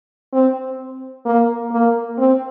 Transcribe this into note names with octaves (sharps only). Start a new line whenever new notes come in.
C4
A#3
A#3
C4